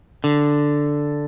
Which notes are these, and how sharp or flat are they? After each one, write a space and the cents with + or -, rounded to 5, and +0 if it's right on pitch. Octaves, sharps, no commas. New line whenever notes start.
D3 +0